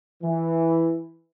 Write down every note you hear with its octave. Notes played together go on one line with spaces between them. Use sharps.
E3